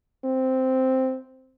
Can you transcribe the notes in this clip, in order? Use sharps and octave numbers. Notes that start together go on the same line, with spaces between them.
C4